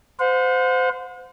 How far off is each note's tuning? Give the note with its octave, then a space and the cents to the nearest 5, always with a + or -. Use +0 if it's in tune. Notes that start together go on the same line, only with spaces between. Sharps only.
C5 -25 F#5 -45